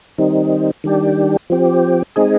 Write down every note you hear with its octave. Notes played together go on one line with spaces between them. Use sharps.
D#3 G3 C4 D#4
D#3 G3 D4 G4
F3 C4 G4
G#3 C4 D#4 G#4